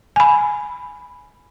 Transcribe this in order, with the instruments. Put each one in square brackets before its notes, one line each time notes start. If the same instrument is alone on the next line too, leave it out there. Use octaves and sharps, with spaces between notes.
[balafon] G#5 B5